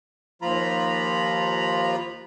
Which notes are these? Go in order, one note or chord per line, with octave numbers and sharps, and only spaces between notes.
D#2 F3 F4 A#5 B5